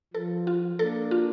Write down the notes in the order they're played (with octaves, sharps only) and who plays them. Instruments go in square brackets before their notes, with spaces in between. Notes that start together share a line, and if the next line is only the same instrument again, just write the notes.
[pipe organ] F3 [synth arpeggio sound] A4
[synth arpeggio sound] F4
[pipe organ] A#3 D4 [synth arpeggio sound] A4
[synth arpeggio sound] F4